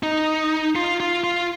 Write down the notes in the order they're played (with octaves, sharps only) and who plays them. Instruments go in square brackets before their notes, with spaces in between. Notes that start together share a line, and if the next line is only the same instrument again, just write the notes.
[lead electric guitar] D#4
F4
F4
F4